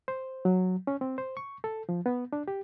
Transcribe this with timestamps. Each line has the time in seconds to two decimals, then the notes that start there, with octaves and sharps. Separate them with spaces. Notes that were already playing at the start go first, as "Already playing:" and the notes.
0.08 C5
0.45 F#3
0.87 C#4
1.01 C4
1.18 C5
1.37 C#6
1.64 A4
1.89 F3
2.06 B3
2.33 D4
2.48 G4